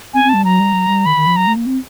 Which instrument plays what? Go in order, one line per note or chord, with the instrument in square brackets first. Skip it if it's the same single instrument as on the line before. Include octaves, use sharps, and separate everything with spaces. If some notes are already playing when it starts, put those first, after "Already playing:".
[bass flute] C4 [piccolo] G#5
[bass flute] C4
[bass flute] G3 [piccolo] A5
[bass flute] F#3 [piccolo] A#5
[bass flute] G3
F#3
G3
[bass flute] D#3 [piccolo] B5
[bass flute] D#3
F3
[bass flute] F#3 [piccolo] A#5
[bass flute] A3
A#3
C4